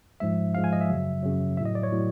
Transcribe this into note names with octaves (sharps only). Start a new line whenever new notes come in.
G#2 F3 G#3 E5
G#2 F3 G#3 F5
G#5
D#5
E5
F#2 C#3 F#3
F#2 C#3 F#3
A2 F#3 E5
D#5
D5
C#5
A2 F#3